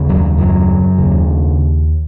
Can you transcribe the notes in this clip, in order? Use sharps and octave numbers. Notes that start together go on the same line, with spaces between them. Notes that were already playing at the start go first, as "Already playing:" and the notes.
Already playing: D#2 C#3
F#2 F#3
F#2 F#3
D#2 C#3